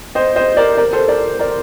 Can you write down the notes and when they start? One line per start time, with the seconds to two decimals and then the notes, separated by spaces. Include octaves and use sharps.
0.15 C5 D#5
0.36 C5 D#5
0.57 A#4 D5
0.77 A#4 D5
0.93 A4 C5
1.08 A#4 D5
1.39 A#4 D5